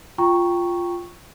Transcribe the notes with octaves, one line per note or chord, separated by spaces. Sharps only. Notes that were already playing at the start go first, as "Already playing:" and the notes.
F4 G5 A#5 C#6